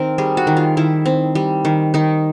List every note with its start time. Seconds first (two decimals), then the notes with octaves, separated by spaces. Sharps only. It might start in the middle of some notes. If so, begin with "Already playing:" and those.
Already playing: D#3 C4 A#4
0.18 G3 G#4
0.37 F#4
0.47 D#3
0.57 F4
0.77 D#3 E4
1.06 C4
1.35 G3
1.65 D#3
1.94 D#3 D#4